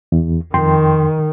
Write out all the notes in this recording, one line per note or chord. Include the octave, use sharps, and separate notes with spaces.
E2
F2 D#3 G5 C6